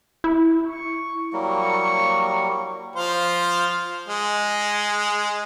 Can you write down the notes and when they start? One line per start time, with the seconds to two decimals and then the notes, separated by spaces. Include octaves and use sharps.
0.24 E4
0.67 C#6
1.33 F#3 G3 A#3 C#6
2.96 F3 C5 F5
4.09 G#3